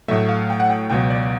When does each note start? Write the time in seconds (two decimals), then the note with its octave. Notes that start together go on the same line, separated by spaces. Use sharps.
0.08 A2 F#3 A3 E5
0.29 F5
0.50 G5
0.60 F#5
0.70 G5
0.90 C#2 B2 F#3 G5
1.10 D5